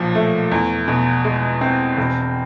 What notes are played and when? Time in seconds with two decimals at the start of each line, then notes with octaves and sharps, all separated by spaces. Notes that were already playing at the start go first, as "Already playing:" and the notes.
Already playing: B1 A#2 F3
0.15 A3
0.51 E2
0.88 B2
1.25 G#3
1.61 C4
1.97 E1